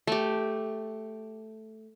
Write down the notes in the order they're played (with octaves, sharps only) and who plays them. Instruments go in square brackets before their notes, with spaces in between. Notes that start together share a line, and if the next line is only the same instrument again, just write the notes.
[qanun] A3 G4